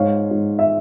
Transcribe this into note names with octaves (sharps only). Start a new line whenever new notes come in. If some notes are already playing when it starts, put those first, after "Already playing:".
Already playing: G#2 C#5 F5
G#2
E5